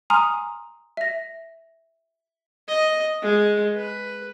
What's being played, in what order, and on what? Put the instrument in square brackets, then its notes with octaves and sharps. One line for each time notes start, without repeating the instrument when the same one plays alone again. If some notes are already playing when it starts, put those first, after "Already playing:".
[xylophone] G#5 A#5 C6 D#6 F6
E5 A#6
[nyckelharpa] D#5
G#3
B4